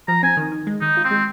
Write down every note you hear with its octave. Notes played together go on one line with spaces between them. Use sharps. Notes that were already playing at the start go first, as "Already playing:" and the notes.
F3 A#5
C4 G#5
D#3
D#3
G#3
D#3 D#4
F4
C4
G#3